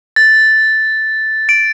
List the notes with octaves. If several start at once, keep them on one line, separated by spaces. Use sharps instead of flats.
A6
D7